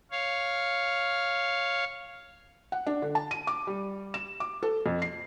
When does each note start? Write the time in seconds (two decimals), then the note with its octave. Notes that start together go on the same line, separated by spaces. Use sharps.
0.11 C#5 F5
2.72 F#5
2.87 D4
3.02 D3
3.15 A5
3.31 D#7
3.47 D6
3.67 G3
4.14 E7
4.40 D6
4.63 A4
4.86 F2
5.02 C7